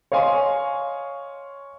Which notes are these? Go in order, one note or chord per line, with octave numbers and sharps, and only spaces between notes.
C#5 D#5 F5 G#5 C6 C#6